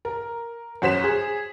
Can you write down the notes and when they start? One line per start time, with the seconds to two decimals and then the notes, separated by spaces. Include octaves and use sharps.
0.05 A#4
0.82 F#2 F#4 C5 B6 E7
1.04 G#4